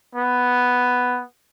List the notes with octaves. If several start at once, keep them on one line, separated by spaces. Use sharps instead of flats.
B3